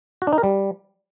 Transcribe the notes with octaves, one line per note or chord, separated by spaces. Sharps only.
F#4
D4
D#4
A#4
G3